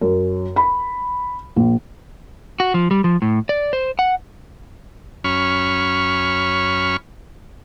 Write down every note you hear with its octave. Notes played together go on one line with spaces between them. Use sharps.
F#2
B5
A#1
F#4
F3
G3
F3
A2
D5
C5
F#5
F#2 C#4 B5 C#6 F6